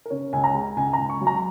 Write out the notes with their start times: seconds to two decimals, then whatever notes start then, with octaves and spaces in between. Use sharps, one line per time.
0.06 A#4
0.10 C#3 C#5
0.33 C#2 G#5
0.44 A#5
0.55 G#3
0.76 C#2 G#5
0.93 A#5
0.99 C#2
1.10 C#6
1.21 F#3
1.27 A#5